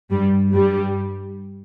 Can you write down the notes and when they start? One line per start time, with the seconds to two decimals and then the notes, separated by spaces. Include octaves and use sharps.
0.11 G2 G3
0.52 G2 G3